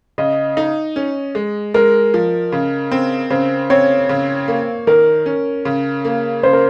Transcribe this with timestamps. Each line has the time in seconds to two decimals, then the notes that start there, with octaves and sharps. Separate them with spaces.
0.18 C#3 D#5
0.57 D#4
0.96 C#4
1.35 G#3
1.74 G#3 A#4
2.14 F3
2.52 C#3
2.91 C4
3.30 C#3 C5
3.70 C4 C#5
4.09 C#3
4.48 A#3
4.87 D#3 A#4
5.26 C#4
5.65 C#3
6.05 A#3
6.43 C#3 C5
6.53 A#4